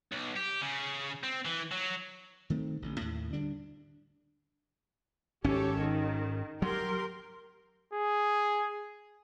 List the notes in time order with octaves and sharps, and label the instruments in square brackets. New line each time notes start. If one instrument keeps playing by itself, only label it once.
[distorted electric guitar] B1
G4
C#3
C4
E3
F#3
[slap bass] D#3 A3 C4
A1 D3
D#2 A2
D2 D3 G3 D4
[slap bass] G#1 C#4 [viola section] G4 A4 C#5
[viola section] D#3
[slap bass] F#3 [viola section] G4 A#4 C6
[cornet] G#4